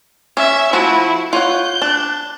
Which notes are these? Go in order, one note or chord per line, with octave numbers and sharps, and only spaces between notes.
C#4 E5
F3 A3 E4 F#4
F4 C#5 F#5 G6
D4